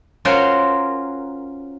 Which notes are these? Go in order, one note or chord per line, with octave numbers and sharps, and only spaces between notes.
C#4 F4 F#4 A#4 C5 C#5